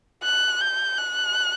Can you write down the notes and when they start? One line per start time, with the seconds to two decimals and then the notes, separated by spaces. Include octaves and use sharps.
0.23 F#6
0.61 G6
0.98 F#6